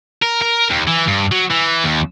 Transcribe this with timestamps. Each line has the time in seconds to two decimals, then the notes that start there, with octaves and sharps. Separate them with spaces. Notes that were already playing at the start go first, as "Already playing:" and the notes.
0.22 A#4
0.42 A#4
0.70 D#2
0.87 E3
1.07 G2
1.32 F#3
1.51 E3
1.84 D#2